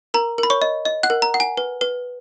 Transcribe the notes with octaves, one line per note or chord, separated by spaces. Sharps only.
A#4 A#5
A#4
B5
C#5 C#6
D#5
D#5
F#5 F#6
A#4
A#5
F#5
G#5
B4
B4